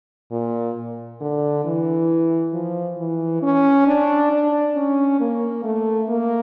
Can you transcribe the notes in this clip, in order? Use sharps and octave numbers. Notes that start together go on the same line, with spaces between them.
A#2
D3
E3
F3
E3
C#4
D4
D4
C#4
A#3
A3
A#3